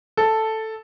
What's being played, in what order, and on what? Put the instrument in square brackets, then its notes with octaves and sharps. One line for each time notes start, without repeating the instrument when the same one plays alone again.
[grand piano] A4